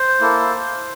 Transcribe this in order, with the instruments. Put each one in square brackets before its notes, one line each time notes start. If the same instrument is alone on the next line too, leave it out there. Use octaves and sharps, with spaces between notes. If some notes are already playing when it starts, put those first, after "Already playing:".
Already playing: [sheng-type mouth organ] C5
A#3 E4 A4